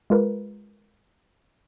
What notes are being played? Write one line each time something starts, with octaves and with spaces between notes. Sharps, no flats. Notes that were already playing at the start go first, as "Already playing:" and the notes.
G#3 F4 A#4 B4